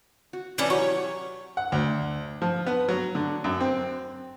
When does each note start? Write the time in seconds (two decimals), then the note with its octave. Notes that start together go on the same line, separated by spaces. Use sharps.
0.33 F#4
0.58 E3 C#4 D4
0.70 F#3 E4 G4 C#5
1.57 F#5
1.72 D2
2.42 F3
2.66 B3
2.89 F#3
3.15 D3
3.44 F#2
3.60 C4